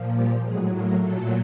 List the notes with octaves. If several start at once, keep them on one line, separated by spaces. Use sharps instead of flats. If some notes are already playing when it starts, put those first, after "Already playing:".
Already playing: A#2 F3
G3 G4
A2 F#3 G#3 G#4
A#3 A#4
A#2 F#3 A3 A4